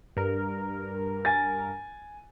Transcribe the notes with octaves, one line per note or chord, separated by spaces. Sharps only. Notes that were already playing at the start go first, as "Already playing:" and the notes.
G2 A#4
G#5 A6